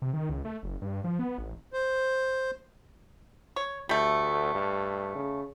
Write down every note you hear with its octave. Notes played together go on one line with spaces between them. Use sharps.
C3
D#3
C#2
A3
F#1
G2
F3
B3
A1
C5
C#5
D2 G3 A3
G2
C#3